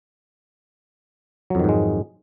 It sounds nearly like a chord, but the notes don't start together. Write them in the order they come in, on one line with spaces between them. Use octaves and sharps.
F#3 F2 D#3 G#2 G#3